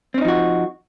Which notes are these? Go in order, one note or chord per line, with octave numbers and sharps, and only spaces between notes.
F3 C4 C#4 D#4 F#4